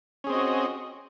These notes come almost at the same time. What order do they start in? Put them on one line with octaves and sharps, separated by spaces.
C#4 G#4 C4 D#5 F#4